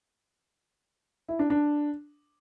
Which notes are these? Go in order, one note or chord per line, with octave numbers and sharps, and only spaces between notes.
E4
D4
D4